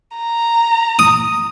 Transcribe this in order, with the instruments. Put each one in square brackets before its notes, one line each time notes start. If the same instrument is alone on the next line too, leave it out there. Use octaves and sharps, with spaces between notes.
[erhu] A#5
[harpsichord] D#6